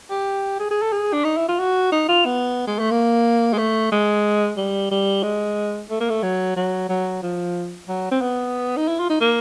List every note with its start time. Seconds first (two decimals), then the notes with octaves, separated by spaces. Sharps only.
0.11 G4
0.60 G#4
0.71 G#4
0.82 A4
0.93 G#4
1.13 D4
1.25 D#4
1.37 E4
1.48 F4
1.59 F#4
1.92 D#4
2.09 F4
2.26 B3
2.67 G#3
2.79 A3
2.91 A#3
3.53 G#3
3.58 A3
3.92 G#3
4.57 G3
4.91 G3
5.23 G#3
5.90 A3
6.01 A#3
6.10 A3
6.23 F#3
6.56 F#3
6.89 F#3
7.23 F3
7.88 F#3
8.11 C4
8.21 B3
8.77 D#4
8.88 E4
9.00 F4
9.10 D#4
9.21 A#3